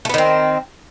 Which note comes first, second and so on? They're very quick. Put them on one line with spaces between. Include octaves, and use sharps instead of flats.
A3 B3 D#3 C4